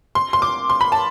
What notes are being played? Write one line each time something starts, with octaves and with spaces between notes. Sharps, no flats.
C6
C6
D6
C6
B5
A5